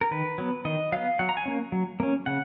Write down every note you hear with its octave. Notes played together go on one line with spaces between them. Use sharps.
A#4
D#3 B4
F#3 B3
D#3 D#5
F#3 B3 F5
F#3 F#5
A#5
G#5
A#3 C#4
F#3
A#3 C#4
C#3 F#5